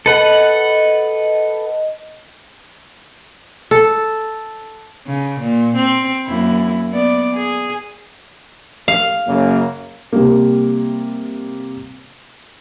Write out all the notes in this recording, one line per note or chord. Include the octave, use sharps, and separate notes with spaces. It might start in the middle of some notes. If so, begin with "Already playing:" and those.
A4 B4 D#5 F#5
A4
C#3
A#2
C4
F#2 A#3 E4
B3 D5
G#4
F5
F#2 C#3 A#3
C3 G3 A#3